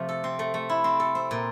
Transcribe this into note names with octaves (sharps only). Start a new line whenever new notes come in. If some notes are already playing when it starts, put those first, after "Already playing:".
Already playing: C3 F3 A3
A4
C4
A3
A3
E4
C4
A4
C4
A#2